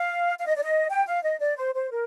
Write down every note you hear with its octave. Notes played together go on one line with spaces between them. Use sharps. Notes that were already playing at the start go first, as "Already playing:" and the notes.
Already playing: F5
F5
D#5
D5
D#5
G5
F5
D#5
D5
C5
C5
A#4